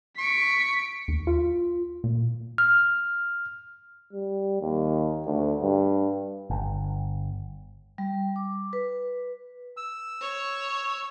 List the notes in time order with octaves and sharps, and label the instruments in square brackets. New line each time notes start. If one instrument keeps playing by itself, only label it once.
[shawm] C#6 [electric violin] B6 D7
[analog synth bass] D#2
F4
A#2
[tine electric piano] F6
[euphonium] G3
D#2
D2
G2
[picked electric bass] G1
[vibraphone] G3
D6
B4
[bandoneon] E6
[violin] C#5